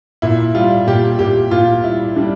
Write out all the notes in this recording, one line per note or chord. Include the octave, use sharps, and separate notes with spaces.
A#2 E4
G3 F4
A#2 G4
A#2 G4
A#2 F4
G3 E4
G3 D4